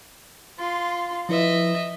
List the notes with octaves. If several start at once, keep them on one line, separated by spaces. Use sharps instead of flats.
F4 C6
F3 E4 B4 D#5 E5